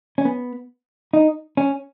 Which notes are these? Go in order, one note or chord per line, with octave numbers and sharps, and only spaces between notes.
C#4
B3
D#4
C#4